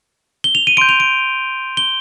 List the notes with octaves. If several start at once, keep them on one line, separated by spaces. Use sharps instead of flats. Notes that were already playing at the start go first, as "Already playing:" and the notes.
G7
F7
D#7
C6 G6 D7
F7
D7
G7